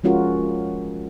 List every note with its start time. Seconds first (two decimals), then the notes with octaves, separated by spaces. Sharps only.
0.04 F3 G#3 C#4 F4 F#4 A#4